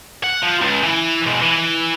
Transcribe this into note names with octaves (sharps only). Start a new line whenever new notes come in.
F#5
F3
C#2
E3
B2 G#3
E3